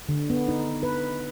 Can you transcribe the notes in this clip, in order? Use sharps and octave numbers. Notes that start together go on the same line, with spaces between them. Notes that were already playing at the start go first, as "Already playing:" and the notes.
D3
B3
D#4
B4